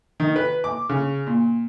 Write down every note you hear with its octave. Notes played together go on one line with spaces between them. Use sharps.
D#3
B4
D6
C#3
A#2